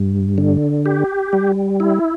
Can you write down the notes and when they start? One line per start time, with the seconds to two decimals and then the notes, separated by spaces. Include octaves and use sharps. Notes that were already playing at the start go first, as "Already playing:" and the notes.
Already playing: G2
0.38 D3
0.86 G4
1.33 G3
1.80 E4